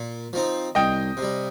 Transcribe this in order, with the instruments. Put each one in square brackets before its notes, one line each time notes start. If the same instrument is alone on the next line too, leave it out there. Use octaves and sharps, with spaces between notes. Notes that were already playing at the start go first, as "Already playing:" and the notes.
Already playing: [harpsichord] A#2
F3 C4 D#4
[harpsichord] C2 [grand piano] D#5 G5
[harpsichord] C3
G3